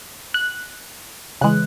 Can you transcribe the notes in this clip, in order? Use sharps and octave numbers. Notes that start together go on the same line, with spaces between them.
F#6
C#3 E3 G#3 F#6